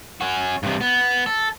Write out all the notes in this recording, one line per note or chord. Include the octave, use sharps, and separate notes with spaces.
C#4 F#4
G2 C3
B3
A4